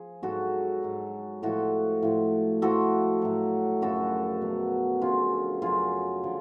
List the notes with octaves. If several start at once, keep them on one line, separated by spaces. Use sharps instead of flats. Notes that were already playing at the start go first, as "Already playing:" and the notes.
Already playing: F3 G#4
G#2 F#3 F#4 A4
G#2 F#3
A2 F3 F#4 A4
A2 F3
A2 F3 F#4 A4
A2 F#3
F#2 C#3 F3 F#4 A4
B2 F#3
F#2 D3 F3 F4 G#4
F#2 C#3 F#3 F4 G#4
D3 F3